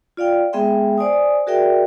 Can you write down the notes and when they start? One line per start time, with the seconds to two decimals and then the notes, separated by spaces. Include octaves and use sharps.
0.17 F4 D5 F5 G5
0.53 G#3 B3 G#4 E5 G5 C6
0.98 C5 D5 G#5 D#6
1.47 F#4 G#4 A#4 D5 E5 G5